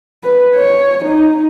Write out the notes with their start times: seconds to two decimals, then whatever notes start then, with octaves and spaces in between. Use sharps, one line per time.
0.24 B4
0.55 C#5
1.04 D#4